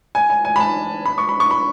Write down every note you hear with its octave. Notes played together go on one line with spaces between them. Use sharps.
G#5
G#5
G#5
B5
A5
B5
C#6
B5
C#6
B5